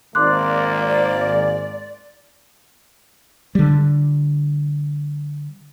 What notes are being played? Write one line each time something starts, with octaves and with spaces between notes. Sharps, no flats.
G#1 G#2 A#3 D5 C6 D6 F#6
D3 G3